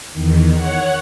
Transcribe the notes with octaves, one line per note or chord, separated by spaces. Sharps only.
E2 D#3
C#5 F#5